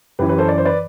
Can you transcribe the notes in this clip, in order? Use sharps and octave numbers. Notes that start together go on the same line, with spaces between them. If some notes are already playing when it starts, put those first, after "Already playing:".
F#2 E3 G4 B4
G4 B4
A4 C5
D5
C5
B4 D5